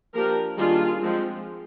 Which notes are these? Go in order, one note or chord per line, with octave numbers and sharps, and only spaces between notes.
F3 A#3 D4 G4 A#4
D#3 G3 A#3 D4 F4 G#4
F3 G#3 C4